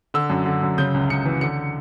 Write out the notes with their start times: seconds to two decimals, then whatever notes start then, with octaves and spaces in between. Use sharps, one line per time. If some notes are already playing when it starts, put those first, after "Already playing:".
0.14 D3 E6
0.30 F#2
0.46 D3
0.63 F#2
0.78 C#3 G6
0.94 C#2
1.10 C#2 C#7
1.25 E3
1.41 D3 C#7